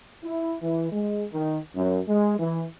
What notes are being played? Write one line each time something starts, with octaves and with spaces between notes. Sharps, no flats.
E4
E3
G#3
D#3
F#2
G#3
E3